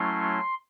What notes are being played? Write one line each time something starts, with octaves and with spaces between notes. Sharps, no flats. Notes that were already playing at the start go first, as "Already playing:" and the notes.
Already playing: F#3 A3 C#4 E4 C6